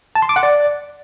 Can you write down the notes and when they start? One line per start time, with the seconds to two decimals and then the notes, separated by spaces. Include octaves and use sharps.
0.15 A5
0.22 C6
0.29 D6
0.36 F#5
0.43 D5